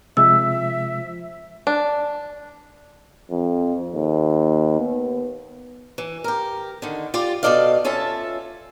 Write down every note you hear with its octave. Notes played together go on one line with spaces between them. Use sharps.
C3 F3 G#3 E5 E6
D4
F2
D#2
B3
E3
G4 A#4
D3 D#3
F4 G4 D5
B2 A3 A4 D5 D#5 F5
C#4 F4 A4 E5 A5